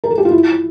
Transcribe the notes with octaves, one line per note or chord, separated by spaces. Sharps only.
A#4
A4
G4
F4
E4